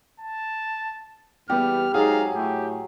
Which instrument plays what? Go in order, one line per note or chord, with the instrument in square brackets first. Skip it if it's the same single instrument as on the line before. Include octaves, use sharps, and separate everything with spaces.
[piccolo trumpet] A5
[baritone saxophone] E2 [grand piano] G3 B3 [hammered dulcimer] G4 [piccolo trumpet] F6
[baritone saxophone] G#2 [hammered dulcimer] F#3 [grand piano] G#4 [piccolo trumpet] F5
[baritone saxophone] A2 [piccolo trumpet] G4